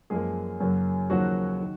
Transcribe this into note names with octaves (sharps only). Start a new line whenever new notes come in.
F#2 F3 G#3 A#3 G#4
F#2 C#3 F#3 A#3
D#2 C#3 F3 F#3 A#3 F#4
D#3